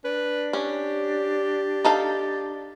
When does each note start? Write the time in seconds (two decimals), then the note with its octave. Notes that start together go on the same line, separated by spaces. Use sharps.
0.05 D4 B4
0.53 C#4 G4
1.85 D#4 A4 F5